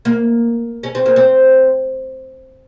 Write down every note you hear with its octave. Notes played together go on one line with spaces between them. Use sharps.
A#3
C#4
C4
A#3
C4